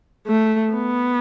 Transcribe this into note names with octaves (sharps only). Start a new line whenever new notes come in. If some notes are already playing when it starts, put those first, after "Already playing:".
A3
B3